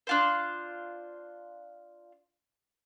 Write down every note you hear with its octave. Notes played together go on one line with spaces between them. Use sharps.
D4 F4 C5